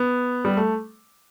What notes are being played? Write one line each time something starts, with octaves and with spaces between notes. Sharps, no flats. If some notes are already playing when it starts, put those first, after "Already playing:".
Already playing: B3
G3
A3